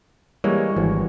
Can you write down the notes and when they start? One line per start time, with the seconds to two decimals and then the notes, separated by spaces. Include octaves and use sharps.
0.44 E3 G3 G#3 A#3 C#5
0.77 G#1 E3